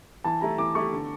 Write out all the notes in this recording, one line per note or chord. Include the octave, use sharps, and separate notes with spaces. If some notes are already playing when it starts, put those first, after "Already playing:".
E3 A5
A3 E4 G4 A#5
E3 D6
A3 E4 G4 C#6
D3